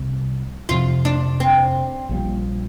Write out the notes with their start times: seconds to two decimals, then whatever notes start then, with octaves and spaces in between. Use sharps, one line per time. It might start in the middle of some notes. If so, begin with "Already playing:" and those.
Already playing: C2 C3
0.69 F2 C3 F3 F4
1.05 D4
1.40 C4
2.09 A#1 A#2 G3